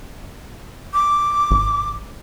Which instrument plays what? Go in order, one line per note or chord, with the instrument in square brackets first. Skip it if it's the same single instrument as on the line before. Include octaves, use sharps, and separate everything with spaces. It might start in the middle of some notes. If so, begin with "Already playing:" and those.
[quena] D6
[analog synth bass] G#1